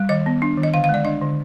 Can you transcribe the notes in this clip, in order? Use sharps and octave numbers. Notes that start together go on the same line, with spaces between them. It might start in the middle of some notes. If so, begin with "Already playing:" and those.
Already playing: G3
D#3 D#5
B3
D4
D#3
D#5
D3 F5
F5
G#3 D5
D4 D#5
D3